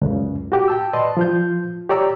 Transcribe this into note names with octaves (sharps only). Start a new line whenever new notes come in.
C#2 F#2 C#3
F#4 G4
G5 A5 E6
B4 D5 D#5 A5 C6
F3 F4 G6
G4 C#5 D5 A#5 E6